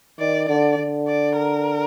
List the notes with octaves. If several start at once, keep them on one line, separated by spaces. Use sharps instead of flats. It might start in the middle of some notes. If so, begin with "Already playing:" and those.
D#3 D5
D3 D5
D3
D5
A#4